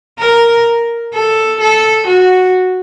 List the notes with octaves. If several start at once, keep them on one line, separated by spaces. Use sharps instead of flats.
A#4
A4
A4
F#4